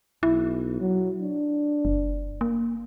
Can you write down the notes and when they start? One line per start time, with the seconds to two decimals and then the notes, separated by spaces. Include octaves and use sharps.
0.23 B1 E4
0.80 F#3
1.22 D4
1.85 F#1
2.41 A#3